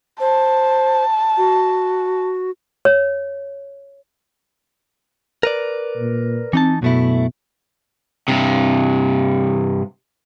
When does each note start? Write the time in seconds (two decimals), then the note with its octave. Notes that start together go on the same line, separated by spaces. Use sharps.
0.20 C5 A5
1.38 F#4
2.85 C#5
5.43 A#4 B4 D5
5.97 A#2
6.53 E3 C4 D#4 A5
6.82 F#2 B2 A3 E4
8.28 G2 C3